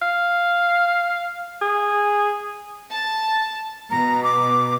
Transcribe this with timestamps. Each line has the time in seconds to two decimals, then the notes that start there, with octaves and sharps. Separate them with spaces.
0.02 F5
1.62 G#4
2.91 A5
3.91 B2 A#5
4.23 D6